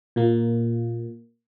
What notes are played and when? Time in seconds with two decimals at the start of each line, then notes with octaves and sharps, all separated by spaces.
0.16 A#2 A#3